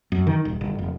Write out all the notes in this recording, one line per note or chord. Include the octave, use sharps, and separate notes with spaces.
F#2
D#3
D#1
G1
F1